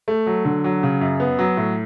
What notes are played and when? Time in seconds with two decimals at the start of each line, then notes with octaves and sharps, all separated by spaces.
0.08 A3
0.26 F#3
0.45 D3
0.64 F#3
0.83 C#3
1.01 F#2
1.20 B3
1.39 F#3
1.57 A2